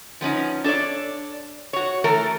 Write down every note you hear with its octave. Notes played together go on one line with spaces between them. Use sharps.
F3 B3 C#4 D#4
D4 A4 B4 C#5 D5
F#4 C#5
E3 A3 A4 A#4